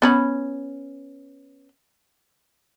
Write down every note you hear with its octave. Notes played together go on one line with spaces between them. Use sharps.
B3 C#4 B5